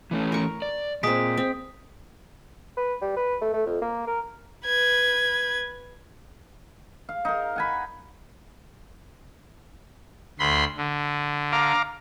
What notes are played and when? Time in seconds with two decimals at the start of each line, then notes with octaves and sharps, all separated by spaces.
0.11 E3 A3 C#4
0.32 A#4 C#6
0.62 D5
1.03 A#2 G#3 C4 D#6 B6 D7
1.37 C4
2.77 B4
3.02 G3
3.17 B4
3.41 A3
3.54 A3
3.66 F2
3.82 A#3
4.07 A#4
4.66 B4 G#6
7.09 F5
7.25 D#4 A#4
7.56 F#5 G#5 B5
10.39 D2 B5 C6
10.78 D3
11.53 F5 A#5 D6